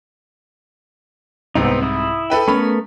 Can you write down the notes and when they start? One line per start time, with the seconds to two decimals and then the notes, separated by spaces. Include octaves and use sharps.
1.55 C2 G#2 C3 B3 C4 D#4
1.83 E4 D#6
2.30 A4 B4 G5
2.48 A3 B3 C#4 A#4 B5